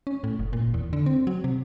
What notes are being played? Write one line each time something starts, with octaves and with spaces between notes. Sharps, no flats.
C#4
A2
F#1
A#2
E2
D3
C4
F#3
C3